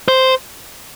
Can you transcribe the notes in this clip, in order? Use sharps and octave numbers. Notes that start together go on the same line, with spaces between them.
C5